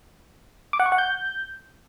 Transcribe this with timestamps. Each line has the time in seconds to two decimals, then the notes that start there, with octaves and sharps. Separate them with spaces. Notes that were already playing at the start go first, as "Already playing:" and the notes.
0.73 D6
0.80 F#5
0.86 C#6
0.92 F#5
0.98 G6